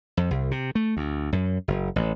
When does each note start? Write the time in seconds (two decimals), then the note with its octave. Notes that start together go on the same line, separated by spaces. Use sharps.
0.17 F2
0.31 C2
0.51 C3
0.75 A3
0.97 D2
1.32 F#2
1.68 F#1
1.96 A1